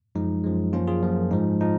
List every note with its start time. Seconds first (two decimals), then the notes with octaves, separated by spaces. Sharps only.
0.15 F#2 F3 G#3 D#4
0.44 F#2 F3 G#3
0.73 F#2 F3 A#3 C#4 F4
0.87 F4 G#4
1.02 F#2 F3 A#3
1.31 G#2 F3 G#3 D#4
1.61 F3 D#4